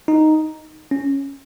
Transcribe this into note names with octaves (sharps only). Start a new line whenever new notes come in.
D#4
C#4